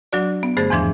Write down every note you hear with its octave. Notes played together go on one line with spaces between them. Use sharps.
F#3 D4 F#4 D5
B3
G2 D3 A3 G#4 C5 A6
E2 G#2 E3 F3 D4